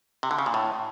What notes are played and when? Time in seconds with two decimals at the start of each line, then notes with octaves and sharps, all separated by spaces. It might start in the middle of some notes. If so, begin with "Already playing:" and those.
0.23 C3
0.31 D3
0.39 C#3
0.46 A#2
0.54 A2